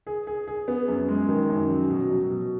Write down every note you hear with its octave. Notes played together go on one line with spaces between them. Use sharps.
G#4
G#4
G#4
B3
F#2
G#3
D#3
F#2
F#3
B2
F#3
B2